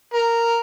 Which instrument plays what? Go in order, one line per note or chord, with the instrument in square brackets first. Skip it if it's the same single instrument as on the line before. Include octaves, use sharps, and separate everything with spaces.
[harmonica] A#4